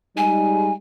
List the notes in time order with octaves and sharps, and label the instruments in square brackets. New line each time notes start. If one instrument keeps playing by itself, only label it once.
[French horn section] G3 G#3 D#4 [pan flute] G#5